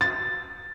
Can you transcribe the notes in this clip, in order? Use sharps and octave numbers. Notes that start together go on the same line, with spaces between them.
A6